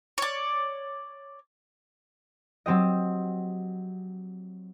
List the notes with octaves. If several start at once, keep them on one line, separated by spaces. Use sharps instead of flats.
C#5 D5
F#3 C4 G4 D#5